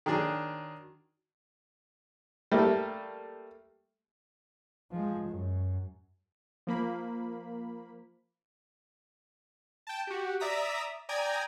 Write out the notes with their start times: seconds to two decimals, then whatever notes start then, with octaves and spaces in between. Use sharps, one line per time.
0.06 D#3 F#3 D4 G#4
2.52 G3 A3 A#3
4.92 F3 G#3
5.27 F#2
6.67 F3 A#3 B5
9.87 G5 A5
10.07 F#4 G4
10.40 D5 E5 A#5 D#6 B6
11.09 D5 G5 G#5 A#5 D#6 G#6